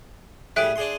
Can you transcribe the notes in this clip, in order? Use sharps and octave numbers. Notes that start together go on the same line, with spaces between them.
A2 G3 G#4 E5 F#6 D7
D4 G#4 C6